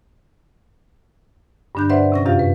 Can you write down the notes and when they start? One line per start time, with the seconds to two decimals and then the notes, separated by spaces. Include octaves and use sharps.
1.75 G2 D3 D4 F#6 G6
1.89 B4 C5 D5 E5 F#5 C6
2.12 C3 C#4 A#6
2.25 F#2 C3 F4 G4 F5
2.39 B4